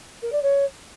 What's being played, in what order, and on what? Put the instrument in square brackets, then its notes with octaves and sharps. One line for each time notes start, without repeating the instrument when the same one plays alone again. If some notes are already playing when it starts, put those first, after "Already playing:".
[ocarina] A#4
D5
C#5